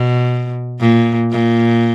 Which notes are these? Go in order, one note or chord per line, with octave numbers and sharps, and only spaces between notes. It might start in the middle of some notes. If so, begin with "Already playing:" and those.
Already playing: B2
A#2
A#2